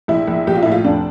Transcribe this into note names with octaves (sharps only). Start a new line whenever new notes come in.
A#1 E4
A#1
A#1 G4
F4
A2 E4
F4
F1 D4